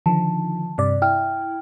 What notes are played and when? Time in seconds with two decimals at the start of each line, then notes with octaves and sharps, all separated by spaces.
0.06 D3 D#3 F3 A5
0.78 G2 C3 D5
1.02 E4 G5 F6